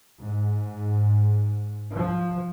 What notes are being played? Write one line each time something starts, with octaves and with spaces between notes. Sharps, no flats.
G#2
F3